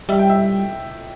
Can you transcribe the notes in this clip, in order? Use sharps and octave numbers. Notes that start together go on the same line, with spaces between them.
G3 E5
G5
E5